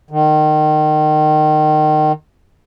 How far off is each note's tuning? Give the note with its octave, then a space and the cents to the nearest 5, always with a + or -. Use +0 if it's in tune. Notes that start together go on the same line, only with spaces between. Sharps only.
D#3 -25